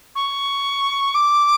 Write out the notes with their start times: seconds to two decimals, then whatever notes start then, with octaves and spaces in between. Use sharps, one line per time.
0.15 C#6
1.14 D6